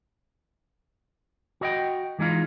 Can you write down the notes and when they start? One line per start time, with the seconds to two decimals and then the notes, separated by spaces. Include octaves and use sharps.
1.61 F#4 D#5 G5
2.19 E3 G#3 D#4 F4